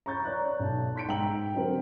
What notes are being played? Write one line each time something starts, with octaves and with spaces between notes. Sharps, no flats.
A#5 B5 C#6 G6 A6
C#5 D5 A#5 F#6
B1 A5
C6 G6 B6 C#7 D7
G#2 G5 A#5 E6 F#7
D3 F#3 C4 A#4